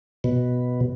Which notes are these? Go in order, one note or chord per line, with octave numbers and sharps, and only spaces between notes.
B2